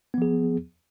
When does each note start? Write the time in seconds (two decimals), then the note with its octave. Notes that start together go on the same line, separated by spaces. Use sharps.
0.14 B3
0.18 F3
0.22 G#4